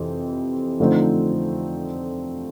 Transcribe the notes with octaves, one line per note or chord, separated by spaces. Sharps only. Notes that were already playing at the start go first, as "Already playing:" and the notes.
Already playing: F2 C3 E3 C4
D3 F3 A3 C4 D#4